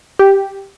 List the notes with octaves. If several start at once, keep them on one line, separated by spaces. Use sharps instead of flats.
G4